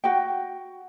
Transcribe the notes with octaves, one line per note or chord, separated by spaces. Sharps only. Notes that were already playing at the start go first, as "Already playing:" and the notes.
F#4 G5